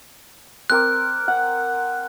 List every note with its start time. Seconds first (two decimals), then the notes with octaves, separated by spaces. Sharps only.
0.70 C4 A#4 D6 F#6
1.28 F#5